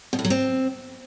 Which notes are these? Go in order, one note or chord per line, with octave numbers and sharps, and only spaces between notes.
B2
A2
F#3
C4